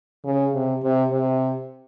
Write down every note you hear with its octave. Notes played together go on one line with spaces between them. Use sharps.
C#3
C3
C3
C3